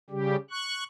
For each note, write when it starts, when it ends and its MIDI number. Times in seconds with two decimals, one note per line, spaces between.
0.10 0.36 49
0.10 0.36 55
0.10 0.36 67
0.51 0.84 85
0.51 0.84 90